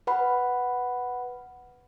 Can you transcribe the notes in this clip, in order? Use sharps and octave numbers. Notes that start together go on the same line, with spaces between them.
B4 F#5 B5